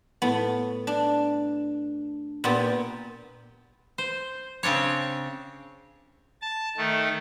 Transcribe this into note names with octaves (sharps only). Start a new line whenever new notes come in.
A2 B3
D4
A#2 B3 G4
C5
C#3 C4 D4 C#5
A5
D#3 A3